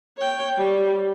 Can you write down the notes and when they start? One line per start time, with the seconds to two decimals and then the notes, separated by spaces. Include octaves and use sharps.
0.17 C#5 G5
0.57 G3